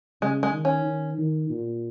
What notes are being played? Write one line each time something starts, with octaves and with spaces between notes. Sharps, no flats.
C#3 G#3
G#3
D#3
C#4
D#3
D#3
A#2